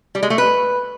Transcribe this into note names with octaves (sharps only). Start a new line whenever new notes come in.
G3
G#3
A3
B4